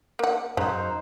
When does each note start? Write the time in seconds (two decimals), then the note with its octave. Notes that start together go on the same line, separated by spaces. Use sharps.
0.19 A#3 F#5
0.57 F#2 C#3 D#4 C5